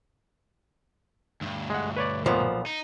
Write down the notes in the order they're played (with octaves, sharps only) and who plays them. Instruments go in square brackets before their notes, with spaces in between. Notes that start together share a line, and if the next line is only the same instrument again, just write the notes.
[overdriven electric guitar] D2 G2
[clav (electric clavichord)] G#3 F#5
B4 C#5 D5
[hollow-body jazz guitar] B1 F3 [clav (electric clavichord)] A#2 B3
[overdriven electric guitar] D#4